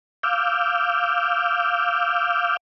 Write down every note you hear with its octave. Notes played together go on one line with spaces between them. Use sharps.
F5 D6 E6 F6 G6